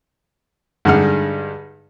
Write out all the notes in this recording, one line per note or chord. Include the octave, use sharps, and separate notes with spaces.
G2 D3 G#3 D#4 F#5 F6